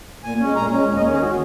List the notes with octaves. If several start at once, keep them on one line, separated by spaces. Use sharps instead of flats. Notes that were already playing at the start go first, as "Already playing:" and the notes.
A#2 G#5
G#3 C#4
A#2 A#5
G#3 C#4
D#2
D#5
D#3 G#3 C#4 C#5
G#4
F#4